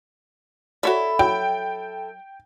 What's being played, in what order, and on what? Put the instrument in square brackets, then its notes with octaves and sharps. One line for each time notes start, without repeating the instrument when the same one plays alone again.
[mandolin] E4 A4 [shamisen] F#4 C#5 D5
[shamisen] F#3 [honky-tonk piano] G5